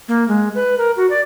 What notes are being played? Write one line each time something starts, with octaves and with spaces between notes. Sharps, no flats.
A#3
G#3
B4
A#4
F#4
D5